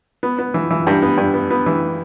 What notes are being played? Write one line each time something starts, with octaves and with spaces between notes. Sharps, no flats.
B3
B3
E3
E3
G2
B3
G2
B3
B3
E3